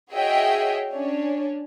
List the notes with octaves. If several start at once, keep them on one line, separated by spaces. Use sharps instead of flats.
F#4 G#4 C#5 D#5 E5 G5
C#4 D4 C#5